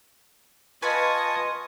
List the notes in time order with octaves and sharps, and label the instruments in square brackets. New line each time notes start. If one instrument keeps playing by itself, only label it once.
[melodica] F4 A5 C#6 [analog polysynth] B4 G#5 [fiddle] D#5